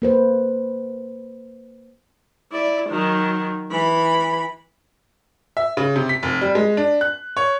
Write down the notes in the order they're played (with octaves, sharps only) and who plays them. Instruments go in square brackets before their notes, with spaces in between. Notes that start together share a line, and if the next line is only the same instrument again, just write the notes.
[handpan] A#3 B4 C5
[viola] E4 D5
D#3 F#3
E3 B5
[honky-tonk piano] E5
C#3
C3
B6
F1
G3
G#3
D4
F#6
C#5